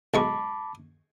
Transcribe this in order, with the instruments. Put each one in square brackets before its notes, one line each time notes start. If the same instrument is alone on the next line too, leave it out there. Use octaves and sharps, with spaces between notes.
[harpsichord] B1 G#3 C#6 [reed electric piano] A5 B5 D6